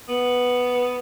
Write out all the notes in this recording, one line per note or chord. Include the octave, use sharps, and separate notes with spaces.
B3